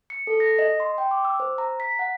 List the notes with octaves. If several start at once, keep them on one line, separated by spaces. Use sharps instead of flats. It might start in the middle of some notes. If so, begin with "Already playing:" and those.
C#7
A4
A#6
D#5
C6
G5
D6
E6
C5
A#5
B6
F#5